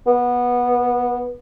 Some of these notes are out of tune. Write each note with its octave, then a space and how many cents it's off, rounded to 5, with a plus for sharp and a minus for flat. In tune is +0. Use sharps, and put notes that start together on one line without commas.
B3 -15